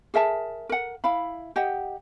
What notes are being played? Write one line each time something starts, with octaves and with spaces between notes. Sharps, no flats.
G#4 A#4 E5 A5
A#4 F#5
E4 F5 B5
G4 D#5 F#5